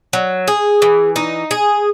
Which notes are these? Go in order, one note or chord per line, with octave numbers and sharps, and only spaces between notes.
F#3
G#4
E3
D#4
G#4